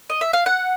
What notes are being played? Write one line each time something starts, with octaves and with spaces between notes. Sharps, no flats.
D#5
E5
F5
F#5